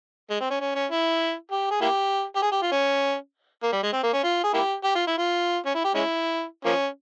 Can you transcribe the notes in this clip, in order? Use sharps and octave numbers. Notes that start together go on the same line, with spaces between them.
G#3
C4
C#4
C#4
C#4
E4
G4
G#4
A#3 E4 G4
G4
G#4
G4
F4
C#4
A#3
G3
G#3
C4
A#3
C#4
F4
G#4
A#3 E4 G4
G4
F4
E4
F4
C#4
E4
G4
G#3 C#4 E4
F3 A#3 C#4